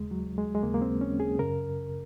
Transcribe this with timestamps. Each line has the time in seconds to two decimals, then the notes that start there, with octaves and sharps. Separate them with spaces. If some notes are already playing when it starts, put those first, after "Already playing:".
Already playing: D#2 C#3 G#3
0.11 F#3
0.38 G#3
0.54 G#3
0.63 D#2 C#3 A#3
0.74 A#3
0.82 C4
1.01 C#4
1.20 G#4
1.39 F#2 C#3 A#4